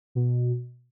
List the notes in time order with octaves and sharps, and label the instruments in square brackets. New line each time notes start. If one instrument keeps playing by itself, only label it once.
[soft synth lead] B2